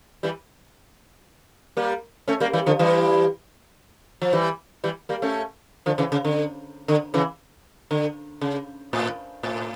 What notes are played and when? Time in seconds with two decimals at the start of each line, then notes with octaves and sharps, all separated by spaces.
0.23 E3 G3
1.77 G3 A#3
2.28 A3 C#4
2.40 G3 A#3
2.53 E3 G3
2.66 D3 F3
2.79 E3 G3
4.22 F3
4.33 E3 G3
4.84 E3 G3
5.09 G3 A#3
5.22 A3 C#4
5.86 D3 F3
5.98 C#3 E3
6.12 C#3
6.25 D3
6.88 D3
7.14 C#3 E3
7.91 D3
8.41 C#3
8.93 A2
9.43 A2